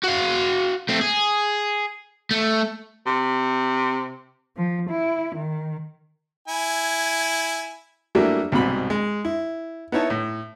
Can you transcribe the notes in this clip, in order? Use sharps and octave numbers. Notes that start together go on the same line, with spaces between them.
F#4 F5
A3 C4
G#4
A3
C3
F3
E4
D#3
E4 G#5
F#3 G3 A3 A#3 D4 E4
C2 G#2 B2 B5
G#3
E4
B3 D#4 E4 C#5 A5
A2